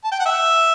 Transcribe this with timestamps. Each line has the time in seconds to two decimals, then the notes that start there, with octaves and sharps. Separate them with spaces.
0.04 A5
0.12 G5
0.19 F#5
0.26 E5